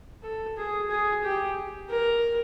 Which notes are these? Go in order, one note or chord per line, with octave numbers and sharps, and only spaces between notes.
A4
G#4
G#4
G4
A#4